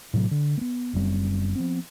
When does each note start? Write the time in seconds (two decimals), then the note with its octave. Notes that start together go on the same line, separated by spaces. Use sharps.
0.14 A2 C3 F#3
0.31 D3
0.57 A#3 B3
0.93 F#1 F#2 G3 C4
1.56 F3 F#3 B3 C4